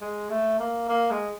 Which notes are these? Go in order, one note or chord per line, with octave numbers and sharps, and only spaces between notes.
G#3
A3
A#3
A#3
G#3